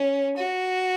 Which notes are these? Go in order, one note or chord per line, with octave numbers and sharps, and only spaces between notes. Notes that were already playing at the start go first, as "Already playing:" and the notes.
Already playing: C#4
F#4